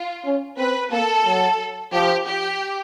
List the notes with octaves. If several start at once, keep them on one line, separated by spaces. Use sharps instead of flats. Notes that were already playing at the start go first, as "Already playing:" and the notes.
Already playing: F4
C#4
C4 B4
A#3 A4
F#3
F3 G4
G4